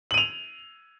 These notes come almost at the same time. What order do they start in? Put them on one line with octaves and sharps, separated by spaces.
F#7 D#7 F7